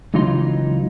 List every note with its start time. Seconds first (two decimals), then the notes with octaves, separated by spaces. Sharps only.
0.14 C#2 E3 F#3 D#4 F4 C6